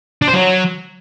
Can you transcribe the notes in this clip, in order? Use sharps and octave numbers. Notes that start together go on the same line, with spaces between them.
D4
C5
F#3